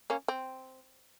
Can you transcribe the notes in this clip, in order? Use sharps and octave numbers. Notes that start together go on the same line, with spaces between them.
A#3 C#4
C4